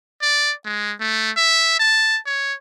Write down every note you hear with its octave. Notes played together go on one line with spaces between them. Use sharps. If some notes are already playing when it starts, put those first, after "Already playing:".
D5
G#3
A3
E5
A5
C#5